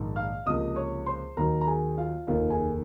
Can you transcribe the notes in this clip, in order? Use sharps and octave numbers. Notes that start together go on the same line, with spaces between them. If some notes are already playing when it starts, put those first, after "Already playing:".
Already playing: A#1 G#2 D#3
F5 F6
C#2 C3 F3 A#3 D#5 D#6
C#5 C#6
C5 C6
D#2 D#3 F#3 A#4 A#5
A#5
G#4 G#5
F4 F5
F1 D#2 D#3 A#3 F4 F5
G#4 G#5